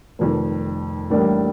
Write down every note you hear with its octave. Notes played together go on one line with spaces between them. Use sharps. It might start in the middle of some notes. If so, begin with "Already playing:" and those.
F1 F2 D#3
A1 A2 G3 A#3 D4